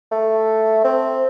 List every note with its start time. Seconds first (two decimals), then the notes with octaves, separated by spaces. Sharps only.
0.11 A3
0.84 C4